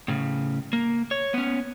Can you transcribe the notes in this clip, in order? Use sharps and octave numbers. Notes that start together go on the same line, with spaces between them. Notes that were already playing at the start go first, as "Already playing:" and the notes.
A2 C#3
A#3
C#5
B3 C#4